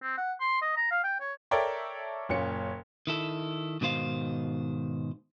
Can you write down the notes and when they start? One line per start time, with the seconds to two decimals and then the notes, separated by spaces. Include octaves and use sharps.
0.02 C4
0.17 F#5
0.40 C6
0.62 D#5
0.76 A#5
0.91 F5
1.04 G5
1.20 C#5
1.51 A4 A#4 C#5 D5 E5 G5
2.29 F#1 A#2 C#4 C#7
3.07 D#3 E4 A4
3.81 G#2 B2 D#3 C5 F5